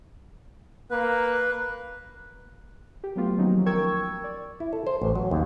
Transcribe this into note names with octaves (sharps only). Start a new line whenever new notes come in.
A#3 B4
G4
F#3 A3 B3 F4 G4
D#3 F3 F#3 A#3 C#4 D#4
A#4 G5 C#6 E6 G#6
D5
E4
A4
C5
A1
F#3
D#2